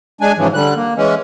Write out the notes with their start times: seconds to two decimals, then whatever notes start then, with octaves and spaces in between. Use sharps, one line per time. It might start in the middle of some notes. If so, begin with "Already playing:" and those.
0.21 G#3 D4 G#5
0.38 G#2 C#3 E3 F3
0.54 D3 G3 F#6
0.76 A#3
0.97 E3 G#3 C#4